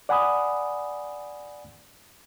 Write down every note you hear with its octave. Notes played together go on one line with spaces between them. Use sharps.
D5 F#5 G#5 B5 D#6